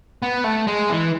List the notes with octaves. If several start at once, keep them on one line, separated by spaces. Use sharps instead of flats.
B3
A3
G#3
E3